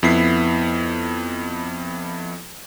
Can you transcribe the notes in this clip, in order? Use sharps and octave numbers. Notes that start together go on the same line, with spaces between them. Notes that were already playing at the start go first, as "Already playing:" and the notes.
F2 B3 E4 B6 C7